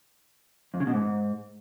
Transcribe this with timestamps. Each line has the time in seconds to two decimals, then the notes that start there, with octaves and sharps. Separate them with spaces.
0.74 F2
0.80 C#3
0.87 B2
0.94 G#2